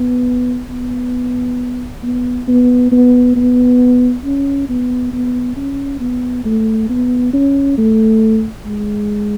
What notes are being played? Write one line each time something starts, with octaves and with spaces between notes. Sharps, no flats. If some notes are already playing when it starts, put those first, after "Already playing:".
Already playing: B3
B3
B3
B3
B3
B3
C#4
B3
B3
C#4
B3
A3
B3
C#4
A3
G#3